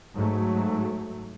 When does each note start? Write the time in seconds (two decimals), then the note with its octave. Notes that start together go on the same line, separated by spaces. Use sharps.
0.15 G#2 F#3 A3